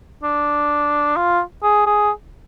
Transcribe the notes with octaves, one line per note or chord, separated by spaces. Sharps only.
D4
F4
G#4
G#4